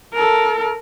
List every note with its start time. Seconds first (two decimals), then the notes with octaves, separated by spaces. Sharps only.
0.14 A4 A#4